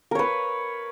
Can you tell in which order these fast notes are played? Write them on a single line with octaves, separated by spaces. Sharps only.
A#4 C#5 B4